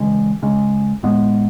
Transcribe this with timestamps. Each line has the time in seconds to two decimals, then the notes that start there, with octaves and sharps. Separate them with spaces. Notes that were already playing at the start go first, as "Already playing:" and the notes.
Already playing: C#3 E3 G#3 C#4
0.42 C#3 G#3 C#4
1.03 A2 G#3 B3